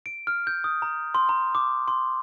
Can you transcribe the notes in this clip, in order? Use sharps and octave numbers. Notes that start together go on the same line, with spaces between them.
D7
F6
G6
D#6
A#5
C6
A#5
D6
C6